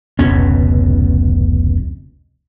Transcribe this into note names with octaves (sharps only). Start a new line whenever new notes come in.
F1 C#2 B2 C#4